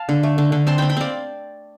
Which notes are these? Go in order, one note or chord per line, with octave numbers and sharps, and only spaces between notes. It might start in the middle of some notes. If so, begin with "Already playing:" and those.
Already playing: F5 A5
D3
A3
D3
D3
C4 A5 C6
C4 G5 B5
G5 B5
C4 D5 F5